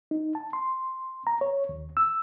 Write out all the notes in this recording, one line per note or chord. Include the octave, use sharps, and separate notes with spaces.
D#4
A5
C6
A#5
C#5
D#2
E6